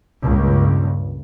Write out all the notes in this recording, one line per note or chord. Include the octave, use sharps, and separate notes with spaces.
C#2 G2 A#2